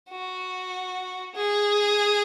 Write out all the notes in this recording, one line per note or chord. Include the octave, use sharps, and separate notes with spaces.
F#4
G#4